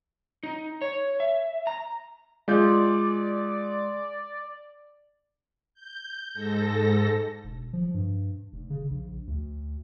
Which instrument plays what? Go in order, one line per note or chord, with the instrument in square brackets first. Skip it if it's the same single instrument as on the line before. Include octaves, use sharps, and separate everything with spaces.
[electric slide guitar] D#4
C#5
E5
A#5
[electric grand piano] G#3 F4 G6 [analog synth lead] D5
[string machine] G6
G#2 A4 A#6
[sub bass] E1
F3
G2
F1
C#3
A#1
D2